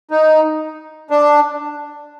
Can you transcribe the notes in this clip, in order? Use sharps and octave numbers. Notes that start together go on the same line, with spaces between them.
D#4
D4